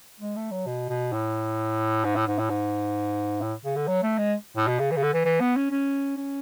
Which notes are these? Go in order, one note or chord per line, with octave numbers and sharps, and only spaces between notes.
G#3
A3
F#3
B2
B2
A2
G#2
A2
G#2
A2
G#2
A2
C#3
D3
F#3
A3
G#3
A2
B2
C#3
E3
C#3
D3
E3
E3
B3
C#4
C#4
C#4